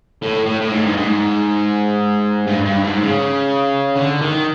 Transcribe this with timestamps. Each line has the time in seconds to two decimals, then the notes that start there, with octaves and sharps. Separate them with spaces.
0.23 A2
0.46 A2
0.61 A2
0.72 G#2
0.86 G2
0.97 G#2
2.47 G2
2.65 G2
2.84 G#2
3.02 C#3
3.96 D3
4.21 D#3